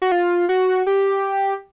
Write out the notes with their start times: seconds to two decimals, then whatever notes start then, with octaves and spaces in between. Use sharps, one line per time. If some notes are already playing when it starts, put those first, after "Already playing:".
0.02 F#4
0.12 F4
0.49 F#4
0.87 G4